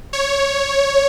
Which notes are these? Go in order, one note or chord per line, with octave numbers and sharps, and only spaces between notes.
C#5